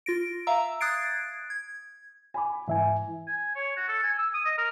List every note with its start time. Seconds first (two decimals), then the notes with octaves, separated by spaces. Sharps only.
0.06 F4 A#6 D7
0.47 E5 F5 A#5 E6
0.81 D#6 F#6 G#6 A6 C7 D7
1.50 G#6
2.34 G#5 B5 D6
2.68 G#2 E3 E5 G#5
3.27 G#5
3.56 C#5
3.77 F#4
3.88 A4
4.04 G#5
4.18 E6
4.34 D#6
4.45 D#5
4.58 A#4